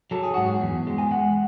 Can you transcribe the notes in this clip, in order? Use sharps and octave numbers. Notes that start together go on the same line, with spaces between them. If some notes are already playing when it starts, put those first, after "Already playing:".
F#3 A4
G#4
G#2 F#4
G#4
E2
G#3
G#5
G#3 F#5